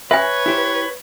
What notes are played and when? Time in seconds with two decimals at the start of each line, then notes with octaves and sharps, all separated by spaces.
0.11 B4 C#5 E5 G#5
0.46 E4 G4 C5